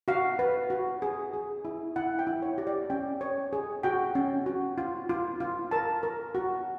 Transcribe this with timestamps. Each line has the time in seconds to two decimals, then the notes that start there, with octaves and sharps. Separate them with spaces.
0.08 F#4 F5
0.39 B4
0.70 F#4
1.02 G#4
1.33 G#4
1.65 E4
1.96 E4 F#5
2.19 G5
2.27 E4
2.42 C#5
2.58 G4
2.67 D5
2.90 C#4 G5
3.21 C#5
3.53 G#4
3.83 F#4 G5
4.15 C#4
4.46 F#4
4.78 F4
5.09 F4
5.40 F4
5.71 A#4 A5
6.03 A#4
6.35 F#4